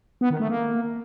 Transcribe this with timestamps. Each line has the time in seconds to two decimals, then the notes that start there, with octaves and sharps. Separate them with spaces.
0.21 B3
0.30 D#3
0.40 A3
0.49 A#3